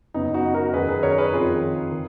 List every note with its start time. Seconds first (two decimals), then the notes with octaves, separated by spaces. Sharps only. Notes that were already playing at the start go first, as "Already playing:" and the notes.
0.14 F#2 C#3 B3 D#4
0.34 D#4 F#4
0.54 F#4 A#4
0.74 F#2 D#3 G#4 B4
0.88 G#4 B4
1.03 A#4 C#5
1.18 G#4 B4
1.32 F2 D#3 F4 G#4
1.92 D#3